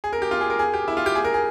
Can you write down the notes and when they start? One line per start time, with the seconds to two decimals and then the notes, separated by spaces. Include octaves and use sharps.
0.04 G#4
0.13 A#4
0.22 G4
0.31 F4
0.41 G#4
0.50 A#4
0.59 G#4
0.73 G4
0.88 E4
0.97 F4
1.06 G4
1.15 G#4
1.24 A#4
1.34 G#4